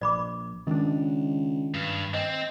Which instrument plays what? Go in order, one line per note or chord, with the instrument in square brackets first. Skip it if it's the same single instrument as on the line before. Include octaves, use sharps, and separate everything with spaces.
[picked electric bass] A#1 [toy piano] D5 B5 D6
[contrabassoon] C#2 [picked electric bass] D#3 D4
[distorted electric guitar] G2
[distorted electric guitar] C4 [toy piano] D#5